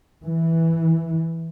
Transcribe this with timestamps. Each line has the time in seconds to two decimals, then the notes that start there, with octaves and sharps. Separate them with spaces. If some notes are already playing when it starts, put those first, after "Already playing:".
0.24 E3